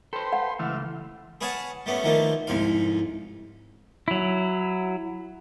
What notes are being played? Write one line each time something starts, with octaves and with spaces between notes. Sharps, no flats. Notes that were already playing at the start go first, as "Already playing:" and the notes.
A4 B4 C5 G5 C6
F#5
C#2 E3 A3 E5 F5
G#4 B4 C#5 F5 F#5 A5
G3 A3 B3 C#4
D#3 F3 A3 A#3
C2 F2 G#2 F5
F#3 E4